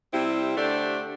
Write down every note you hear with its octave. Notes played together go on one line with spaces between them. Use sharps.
C3 G3 C4 E4
D3 A3 D4 G4 C5